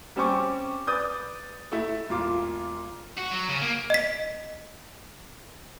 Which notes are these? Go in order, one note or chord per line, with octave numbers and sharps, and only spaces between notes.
G3 C4 C#4 G4 C#6 D6
B4 D5 D#6 G6
A3 E4
E1 A#2 F4 D6
F#4
F#3
C#3
A#3
D#5 B6